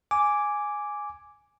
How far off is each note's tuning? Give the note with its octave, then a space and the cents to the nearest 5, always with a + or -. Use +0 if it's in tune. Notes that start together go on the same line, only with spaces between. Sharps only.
G#5 +0 D6 -5